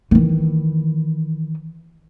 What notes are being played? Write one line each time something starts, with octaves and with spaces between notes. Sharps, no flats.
D#3 E3